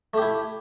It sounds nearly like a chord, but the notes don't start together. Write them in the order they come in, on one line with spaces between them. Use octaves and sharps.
A3 G4 E4